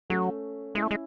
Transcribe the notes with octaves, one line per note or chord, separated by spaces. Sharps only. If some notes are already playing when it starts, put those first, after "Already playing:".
F#3 A3 C#4
G#3 C#4 E4
A3
G#3